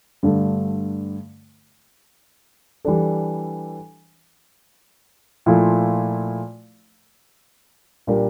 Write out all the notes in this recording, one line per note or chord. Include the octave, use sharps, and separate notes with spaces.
G2 D3 A3
E3 G3 D4 A4
A#2 F3 A3 E4
A#2 G3 D4 G4 A#4